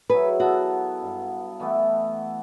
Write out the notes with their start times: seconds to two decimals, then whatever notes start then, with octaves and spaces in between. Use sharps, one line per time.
0.09 F#3 E4 G#4 B4
0.40 B3 F#4 A4 F#5
1.02 G2
1.60 E3 A3 B3